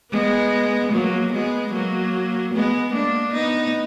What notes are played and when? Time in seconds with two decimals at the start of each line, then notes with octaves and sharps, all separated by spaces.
0.12 G#3 B3
0.92 F#3 A#3
1.32 G#3 B3
1.73 F#3 A#3
2.53 G#3 B3
2.93 A#3 D4
3.34 B3 D#4